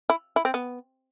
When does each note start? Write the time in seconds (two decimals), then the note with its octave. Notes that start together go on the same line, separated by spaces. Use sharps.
0.10 E4
0.36 E4
0.45 C4
0.54 B3